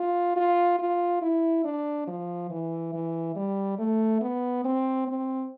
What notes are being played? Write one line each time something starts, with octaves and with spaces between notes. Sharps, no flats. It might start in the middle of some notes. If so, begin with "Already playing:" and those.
Already playing: F4
F4
F4
E4
D4
F3
E3
E3
G3
A3
B3
C4
C4